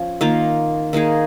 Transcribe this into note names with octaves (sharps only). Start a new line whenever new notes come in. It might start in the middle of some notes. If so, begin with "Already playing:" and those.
Already playing: F3 C#4
D#3 A#3 F4
D#3 A#3 D#4 G#4